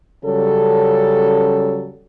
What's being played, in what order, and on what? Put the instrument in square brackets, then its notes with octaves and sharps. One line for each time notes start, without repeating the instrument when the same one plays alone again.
[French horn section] C#3 F#3 G3 C#4 A4